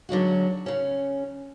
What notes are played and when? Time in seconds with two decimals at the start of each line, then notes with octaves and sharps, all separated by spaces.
0.09 D3 F#3 G#3 F#4
0.66 C#3 C#4